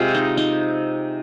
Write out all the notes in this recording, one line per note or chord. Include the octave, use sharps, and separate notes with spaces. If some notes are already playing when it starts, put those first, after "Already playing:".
Already playing: C3 G#3 F4
D#4
D#4